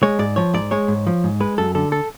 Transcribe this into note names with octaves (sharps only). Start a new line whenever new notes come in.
G#3 C#5
G#2 D5
F3 C#5
G#2 D5
G#3 C#5
G#2
F3
G#2
G#3 B4
F#2 A4
D3 A4
A4